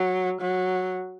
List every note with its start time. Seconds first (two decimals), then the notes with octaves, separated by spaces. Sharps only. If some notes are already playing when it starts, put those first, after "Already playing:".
Already playing: F#3
0.41 F#3